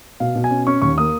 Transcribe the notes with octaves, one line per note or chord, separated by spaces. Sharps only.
B2 F5
B2
G#5
C#4
C#4 C#6
D#2 C#6
A#3 D#6